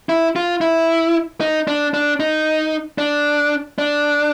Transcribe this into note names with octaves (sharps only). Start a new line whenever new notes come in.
E4
F4
E4
D#4
D4
D4
D#4
D4
D4